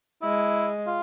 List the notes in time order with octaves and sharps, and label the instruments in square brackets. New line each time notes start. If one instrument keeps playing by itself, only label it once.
[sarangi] G#3 [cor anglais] E4
[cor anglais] F4